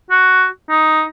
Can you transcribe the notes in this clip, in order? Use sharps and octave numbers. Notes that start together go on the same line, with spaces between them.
F#4
D#4